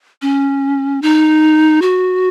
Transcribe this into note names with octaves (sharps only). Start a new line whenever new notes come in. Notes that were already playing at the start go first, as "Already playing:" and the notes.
C#4
D#4
F#4